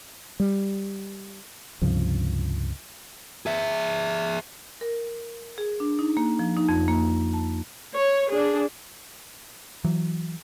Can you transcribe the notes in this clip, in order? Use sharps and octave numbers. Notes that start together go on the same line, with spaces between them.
G3
C#2 G2 C3 F3
G#4 E5
A#4
G#4
D4
D#4
A#3
F3
D#4
F2
A#3
A5
C#5
D4 G#4
E3 F#3